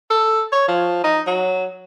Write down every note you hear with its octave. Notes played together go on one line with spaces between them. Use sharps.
A4
C#5
F3
D#4
F#3